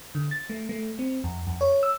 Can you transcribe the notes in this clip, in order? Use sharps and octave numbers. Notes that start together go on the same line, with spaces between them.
D3
A6
A3
A3
C4
F2
F2
C#5
E6